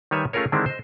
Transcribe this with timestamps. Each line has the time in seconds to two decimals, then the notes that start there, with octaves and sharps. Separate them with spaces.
0.11 D#3 G3 B4 C#5 E5 G#5
0.33 A3 C#4 F4 G#4 A#4 C#5
0.52 D3 D#3 G#3 C4 D4 E4
0.66 C5 D#5